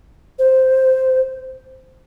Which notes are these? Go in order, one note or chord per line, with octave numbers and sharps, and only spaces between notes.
C5